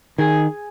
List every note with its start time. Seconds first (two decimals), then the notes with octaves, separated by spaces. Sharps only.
0.18 D#3 G#4